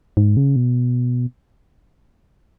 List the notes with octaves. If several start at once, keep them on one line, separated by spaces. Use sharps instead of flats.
G#2
C#3
B2